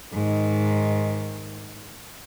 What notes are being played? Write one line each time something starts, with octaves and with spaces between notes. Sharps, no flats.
G#2 D#3